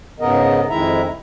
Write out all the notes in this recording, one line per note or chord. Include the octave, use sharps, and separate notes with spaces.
G#2 C#3 B3 A#4 D#5
F2 D#3 G#3 E4 E5 A#5